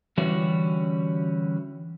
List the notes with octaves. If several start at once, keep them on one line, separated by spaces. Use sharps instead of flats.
D3 E3 G3 C#4 F#4 D5